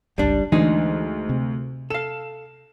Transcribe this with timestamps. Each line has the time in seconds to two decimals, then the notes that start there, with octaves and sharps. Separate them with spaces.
0.18 G1 C#2 G3 D4
0.52 D2 E3 G#3 D4 D#4 G#4
1.29 C3 C4
1.90 A4 F5 E7